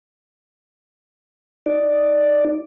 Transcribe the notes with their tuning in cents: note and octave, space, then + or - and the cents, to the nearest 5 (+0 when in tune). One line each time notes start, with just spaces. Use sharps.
D#4 +0 D5 +0